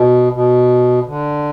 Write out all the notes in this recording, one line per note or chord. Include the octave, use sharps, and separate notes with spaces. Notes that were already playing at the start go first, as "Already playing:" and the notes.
Already playing: B2
B2
D3